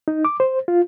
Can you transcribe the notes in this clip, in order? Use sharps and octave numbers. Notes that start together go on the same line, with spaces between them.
D#4
D6
C5
F4